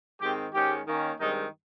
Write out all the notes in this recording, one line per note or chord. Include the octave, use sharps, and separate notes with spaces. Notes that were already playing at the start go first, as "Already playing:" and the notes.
G#2 D#3 G#3 C4 G4
G#2 D#3 G#3 C#4 G4
D#3 A#3 C#4
G2 D#3 G#3 C4 D#4